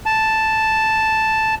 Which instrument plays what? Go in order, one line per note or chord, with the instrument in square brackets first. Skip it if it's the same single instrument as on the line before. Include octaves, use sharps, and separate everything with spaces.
[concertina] A5